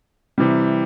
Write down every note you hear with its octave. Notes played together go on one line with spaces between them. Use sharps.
C3 E3 G3